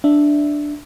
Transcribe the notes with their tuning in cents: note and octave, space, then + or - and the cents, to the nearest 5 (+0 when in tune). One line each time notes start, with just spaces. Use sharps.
D4 +0 E5 +0